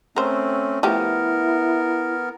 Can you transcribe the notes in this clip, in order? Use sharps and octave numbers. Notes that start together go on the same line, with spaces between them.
A3 C4 C#4 A#4 C5
F3 A3 B3 E4 G4 A#4